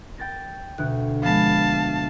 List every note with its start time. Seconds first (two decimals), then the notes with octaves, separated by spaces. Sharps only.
0.18 G5 A6 A#6
0.78 D2 B2 F#6
1.23 F3 G#3 B3 F5 A5